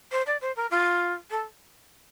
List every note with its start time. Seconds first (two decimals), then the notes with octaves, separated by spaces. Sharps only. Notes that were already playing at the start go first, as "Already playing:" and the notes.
0.11 C5
0.26 D5
0.41 C5
0.56 A#4
0.70 F4
1.30 A4